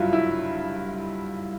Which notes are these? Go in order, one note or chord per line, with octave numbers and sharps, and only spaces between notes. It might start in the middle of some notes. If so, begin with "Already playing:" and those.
Already playing: G2 F#3 E4 F4
E4